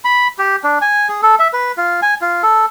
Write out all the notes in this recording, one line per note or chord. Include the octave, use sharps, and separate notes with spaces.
B5
G4
D4
G#5
G#4
A4
E5
B4
F4
G#5
F4
A4